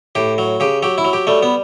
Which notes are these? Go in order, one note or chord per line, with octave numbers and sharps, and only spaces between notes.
A2 G4
F#3
C#3 G4
F#3 G4
E4
F#3
G4
G3 A3
B3